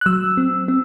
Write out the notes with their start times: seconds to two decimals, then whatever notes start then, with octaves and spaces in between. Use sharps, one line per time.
0.01 F#6
0.06 F#3 E6
0.37 C4
0.68 C4